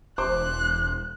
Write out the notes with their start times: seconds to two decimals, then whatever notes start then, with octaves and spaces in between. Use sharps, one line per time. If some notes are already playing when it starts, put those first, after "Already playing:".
0.18 E1 C5 D6 F#6